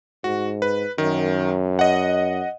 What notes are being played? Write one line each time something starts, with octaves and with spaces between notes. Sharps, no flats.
G#2 F#4
B4
F#2 D#3
D#5 F#5